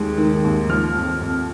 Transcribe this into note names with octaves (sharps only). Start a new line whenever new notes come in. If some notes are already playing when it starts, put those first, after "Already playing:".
Already playing: D#2 G#3 D#4
D#3
D#2
F3 F6
F2
F2